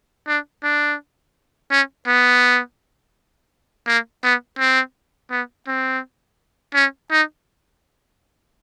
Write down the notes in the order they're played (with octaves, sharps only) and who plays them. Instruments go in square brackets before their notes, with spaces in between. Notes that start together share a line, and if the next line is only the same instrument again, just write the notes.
[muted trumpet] D4
D4
C#4
B3
A#3
B3
C4
B3
C4
C#4
D#4